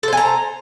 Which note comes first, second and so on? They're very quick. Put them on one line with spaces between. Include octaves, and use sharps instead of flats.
A4 C5 G#5 A#5